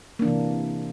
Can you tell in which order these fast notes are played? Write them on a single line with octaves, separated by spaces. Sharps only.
A#3 D4 E3 C3